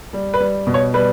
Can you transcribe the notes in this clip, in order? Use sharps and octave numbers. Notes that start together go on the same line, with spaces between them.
G3
B4
G3
B2
C#5
G3 B4